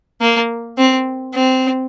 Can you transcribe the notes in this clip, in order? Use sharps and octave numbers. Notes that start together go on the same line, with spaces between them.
A#3
C4
C4